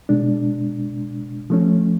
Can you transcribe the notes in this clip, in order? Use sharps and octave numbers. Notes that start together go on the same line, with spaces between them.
B2 G#3 D4
F3 A3 C#4